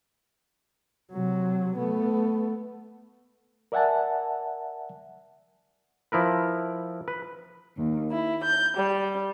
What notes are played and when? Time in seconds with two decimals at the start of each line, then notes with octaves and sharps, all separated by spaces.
1.12 C3 F#3
1.77 A3 B3
3.72 A#4 D5 E5 F#5 G#5 A5
6.12 F3 E4 A#4 B4
7.08 B4
7.76 D#2
8.10 E4
8.42 G6
8.76 G3